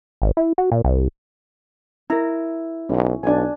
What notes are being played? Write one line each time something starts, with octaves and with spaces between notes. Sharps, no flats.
G#1
E4
F#4
A#2
C2
E4 A#4 A#5
B1 C#4
B1 D4 G#5